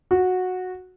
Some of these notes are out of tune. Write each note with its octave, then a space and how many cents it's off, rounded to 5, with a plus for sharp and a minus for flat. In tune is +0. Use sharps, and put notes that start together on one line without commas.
F#4 -10